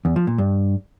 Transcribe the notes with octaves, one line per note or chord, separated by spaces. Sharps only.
E2
F3
A#2
G2